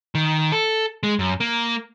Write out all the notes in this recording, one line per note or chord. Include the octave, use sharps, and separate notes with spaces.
D#3
A4
G#3
F#2
A#3